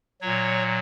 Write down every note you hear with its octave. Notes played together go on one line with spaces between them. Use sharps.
A#2 F#3 C#5